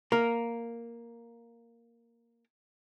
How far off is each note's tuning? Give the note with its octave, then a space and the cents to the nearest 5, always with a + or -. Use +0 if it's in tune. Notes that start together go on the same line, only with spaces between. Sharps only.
A#3 +0 A#4 +0